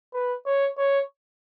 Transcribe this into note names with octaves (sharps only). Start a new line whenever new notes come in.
B4
C#5
C#5